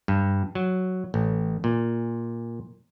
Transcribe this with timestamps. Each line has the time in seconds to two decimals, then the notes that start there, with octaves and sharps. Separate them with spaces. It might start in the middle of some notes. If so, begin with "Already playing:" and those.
0.08 G2
0.55 F#3
1.14 A1
1.64 A#2